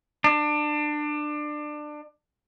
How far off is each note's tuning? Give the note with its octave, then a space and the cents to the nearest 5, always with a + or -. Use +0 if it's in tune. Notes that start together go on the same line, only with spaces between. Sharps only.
D4 +25